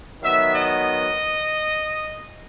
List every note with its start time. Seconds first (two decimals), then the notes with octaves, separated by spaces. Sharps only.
0.22 D#3 F#3 B3 E5
0.54 D#5